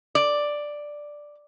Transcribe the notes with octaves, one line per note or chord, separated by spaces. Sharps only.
D5